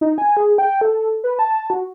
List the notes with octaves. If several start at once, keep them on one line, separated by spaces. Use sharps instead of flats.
D#4
G#5
G#4
G5
A4
B4
A5
F#4